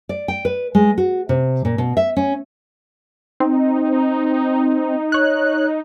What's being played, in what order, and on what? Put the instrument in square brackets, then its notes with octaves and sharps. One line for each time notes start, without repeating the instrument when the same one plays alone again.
[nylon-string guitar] D5
G5
B4
G#3
F#4
C3
A#2
B2
E5
C#4
[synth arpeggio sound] C4 [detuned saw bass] D#4
[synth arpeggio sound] C#5 F#6